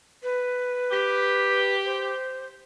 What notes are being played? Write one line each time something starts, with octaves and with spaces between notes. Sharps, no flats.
B4
G4
C5